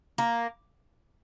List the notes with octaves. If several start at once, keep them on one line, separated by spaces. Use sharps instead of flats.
A#3